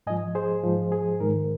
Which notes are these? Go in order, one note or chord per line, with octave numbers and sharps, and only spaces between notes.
G#2 F3 D#5 G#5
G#4 C5
G#2 F3
G#4
G#2 D#3 A#4